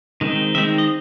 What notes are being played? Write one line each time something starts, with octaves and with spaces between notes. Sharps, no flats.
D#3 G#3 C4 D#4
D#3 G#3 C4 D#4 E5
D#5